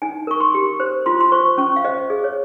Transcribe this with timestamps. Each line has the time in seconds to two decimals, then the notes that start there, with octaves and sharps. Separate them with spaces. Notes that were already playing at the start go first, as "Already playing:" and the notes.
0.02 D#4 G#5
0.27 A#4 C#6
0.40 C6
0.55 G4
0.80 C5
1.06 F4 C6
1.20 C6
1.32 C5 C#6
1.58 C#4 C#6
1.76 F5
1.85 C5 D#5
2.10 G#4 D#5
2.24 C#5